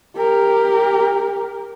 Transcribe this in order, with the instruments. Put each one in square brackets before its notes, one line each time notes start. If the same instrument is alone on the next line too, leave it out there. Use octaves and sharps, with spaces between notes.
[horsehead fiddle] G4 A#4